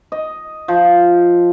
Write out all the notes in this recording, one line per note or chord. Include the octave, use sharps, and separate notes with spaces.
D#5
F3